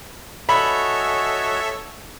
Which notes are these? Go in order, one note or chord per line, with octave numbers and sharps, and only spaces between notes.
F#4 A4 C#5 D#5 E5 G#5 B5